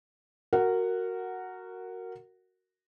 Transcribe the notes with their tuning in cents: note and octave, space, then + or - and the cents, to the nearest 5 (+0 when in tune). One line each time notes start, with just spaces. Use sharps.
F#4 +0 A#4 -15 F#5 +0